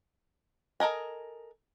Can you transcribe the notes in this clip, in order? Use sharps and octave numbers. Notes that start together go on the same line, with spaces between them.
A4 A#4 D#5 G#5